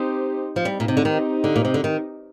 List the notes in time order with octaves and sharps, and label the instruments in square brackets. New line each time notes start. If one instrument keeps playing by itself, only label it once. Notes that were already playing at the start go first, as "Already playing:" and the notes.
Already playing: [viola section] C4 D#4 G4 C5
[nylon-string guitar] F3
[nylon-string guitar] G3 [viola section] C4 D#4 G4
[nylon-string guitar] A#2
C3
D3
D#3
D3
A#2
C3
D3
D#3